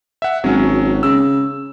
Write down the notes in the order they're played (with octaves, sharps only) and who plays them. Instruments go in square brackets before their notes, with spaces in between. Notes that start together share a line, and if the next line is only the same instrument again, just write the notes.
[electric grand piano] E5 F#5
[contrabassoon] G#1 [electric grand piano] F#3 C#4
[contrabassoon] C#3 [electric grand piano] E6